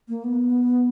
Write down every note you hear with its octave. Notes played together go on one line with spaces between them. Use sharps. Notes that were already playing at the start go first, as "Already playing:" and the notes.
A#3
B3